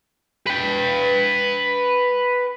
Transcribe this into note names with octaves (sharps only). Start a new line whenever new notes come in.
B4 G5